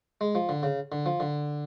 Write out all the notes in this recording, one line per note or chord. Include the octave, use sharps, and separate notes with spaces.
G#3
F3
D3
C#3
D3
F3
D3